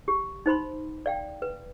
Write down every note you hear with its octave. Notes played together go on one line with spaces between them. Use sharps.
G4
D#4 C5 B5 C6
D5 F5 G5
B4